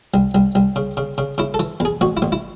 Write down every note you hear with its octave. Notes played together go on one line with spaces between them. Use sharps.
C2
C2
C2
C#3
C#3
C#3
C#3 E4
A4
E3
E2 G#4
A1 F#4
E4
A1
E4